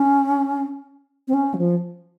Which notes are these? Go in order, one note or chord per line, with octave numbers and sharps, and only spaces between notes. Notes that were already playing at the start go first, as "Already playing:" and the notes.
Already playing: C#4
C4
C#4
F#3
F3